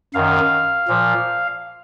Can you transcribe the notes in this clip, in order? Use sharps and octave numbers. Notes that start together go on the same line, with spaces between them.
F#2 D#3 F5
A#2 F3